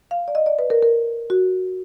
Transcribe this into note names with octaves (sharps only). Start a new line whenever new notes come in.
F5
D5
D#5
D5
B4
A#4
A#4
F#4